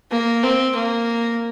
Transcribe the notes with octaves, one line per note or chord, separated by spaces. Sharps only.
A#3
C4
A#3